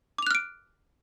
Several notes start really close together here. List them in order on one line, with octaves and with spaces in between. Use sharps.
D6 F7 F#6 F6 D7